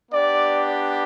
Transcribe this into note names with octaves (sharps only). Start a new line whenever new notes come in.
B3 D4 G4 D5